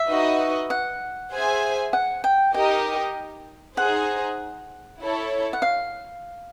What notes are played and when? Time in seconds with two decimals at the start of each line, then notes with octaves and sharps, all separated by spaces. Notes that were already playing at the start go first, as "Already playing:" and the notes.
Already playing: E5
0.09 D#4 F#4 B4 D#5
0.70 F#5
1.31 G#4 C5 E5 G#5
1.93 F#5
2.24 G5
2.54 D#4 G4 A#4 D#5 G5
3.77 D#4 G#4 C5 F#5
5.01 E4 A4 C#5
5.53 F#5
5.62 F5